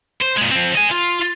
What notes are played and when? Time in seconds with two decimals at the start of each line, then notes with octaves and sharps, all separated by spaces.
0.22 C5
0.37 A#2 G#3
0.52 F3 C4
0.75 D#5 G#5
0.91 F4